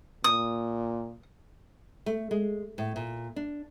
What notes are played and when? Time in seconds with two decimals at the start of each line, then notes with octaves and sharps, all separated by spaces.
0.24 A#2 D#6
2.06 A3
2.31 G#3
2.78 A2
2.96 A#2
3.36 D4